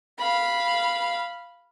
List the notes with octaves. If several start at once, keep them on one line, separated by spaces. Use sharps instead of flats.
F5 B5